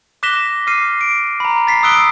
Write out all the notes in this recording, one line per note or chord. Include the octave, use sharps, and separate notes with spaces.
D6 F#6 A#6 B6 E7 G7
D6 F6 C7 D#7
D7
A#5 B5
A6 B6 C7
D#6 E6 F#6 D7 G7